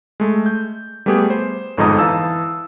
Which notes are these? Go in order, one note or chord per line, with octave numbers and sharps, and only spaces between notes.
G#3 A3
G6
G3 A3 B3 G4 G#4
C5
G1 F2 G#2 D#4 A#5 D#6
E3 F5 A5 E6